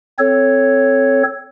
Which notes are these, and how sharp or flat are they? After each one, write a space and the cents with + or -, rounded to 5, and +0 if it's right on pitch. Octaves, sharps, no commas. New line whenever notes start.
C4 +0 A4 +0 C#5 +0